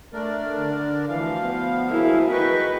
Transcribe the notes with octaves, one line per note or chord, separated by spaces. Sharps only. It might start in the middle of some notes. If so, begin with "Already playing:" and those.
A3 D4 A#4 D5
D3
D2 E3 F3 F5
B3
E4 F#4 G#4 A#4
B4 D#5 G5 C#6